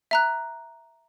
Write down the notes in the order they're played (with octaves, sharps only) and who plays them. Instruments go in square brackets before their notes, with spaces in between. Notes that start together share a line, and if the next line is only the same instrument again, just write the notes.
[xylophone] E5 A#5 F#6